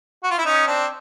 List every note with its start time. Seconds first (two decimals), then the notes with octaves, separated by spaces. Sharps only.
0.23 F#4
0.31 F4
0.38 E4
0.45 C#4 D#4
0.67 C4 D4